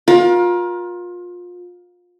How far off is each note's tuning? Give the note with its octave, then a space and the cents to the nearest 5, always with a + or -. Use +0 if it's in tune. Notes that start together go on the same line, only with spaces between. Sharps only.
F4 +25 A#4 +35